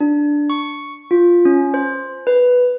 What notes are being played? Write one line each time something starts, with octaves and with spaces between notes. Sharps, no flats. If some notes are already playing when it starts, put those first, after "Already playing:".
D4
C#6
F4
C#4
C5
B4